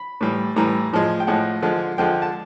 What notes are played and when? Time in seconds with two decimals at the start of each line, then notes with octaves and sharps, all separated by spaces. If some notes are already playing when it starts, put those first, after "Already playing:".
Already playing: B5
0.21 A2 E3 G3
0.56 A2 E3 G3 A#5
0.93 A2 F3 G#3
1.20 G5
1.27 A2 F3 G#3 F#5
1.62 D3 F3 G#3
1.98 D3 F3 G#3 G5
2.22 A5